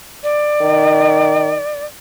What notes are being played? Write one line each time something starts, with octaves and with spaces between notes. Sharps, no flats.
D5
D#3